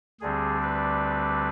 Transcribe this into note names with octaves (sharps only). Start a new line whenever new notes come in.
D2 D3 G3 C4 G#4
B4